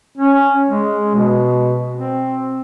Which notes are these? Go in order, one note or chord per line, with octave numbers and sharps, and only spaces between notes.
C#4
G#3
B2
C4